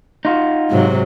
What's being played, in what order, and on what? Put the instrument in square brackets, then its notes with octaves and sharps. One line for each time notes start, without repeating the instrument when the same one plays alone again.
[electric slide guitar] D#4 F4 F#4
[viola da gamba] G#2 C3 F#3